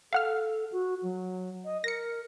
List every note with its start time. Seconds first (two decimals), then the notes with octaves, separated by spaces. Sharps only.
0.13 A4 F5 F#5 F6
0.72 F#4
1.03 F#3
1.65 D#5
1.84 A#4 A#6 C#7